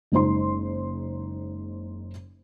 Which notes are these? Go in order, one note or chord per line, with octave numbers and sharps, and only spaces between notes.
F#1 G#3 D#4 C5 C6